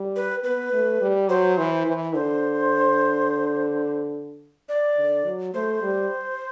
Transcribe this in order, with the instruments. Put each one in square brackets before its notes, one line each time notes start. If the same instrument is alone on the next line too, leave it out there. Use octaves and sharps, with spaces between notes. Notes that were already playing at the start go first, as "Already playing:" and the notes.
Already playing: [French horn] G3
[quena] B4
[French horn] B3 [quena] B4
[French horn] A3
G3
[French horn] F#3 [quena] C5
[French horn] E3
E3
[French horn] D3 [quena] C5
[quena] D5
[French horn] D3
F#3
[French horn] A3 [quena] C5
[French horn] G3